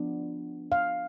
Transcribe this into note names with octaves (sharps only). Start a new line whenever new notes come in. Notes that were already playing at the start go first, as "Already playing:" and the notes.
Already playing: F3 B3 D4
F5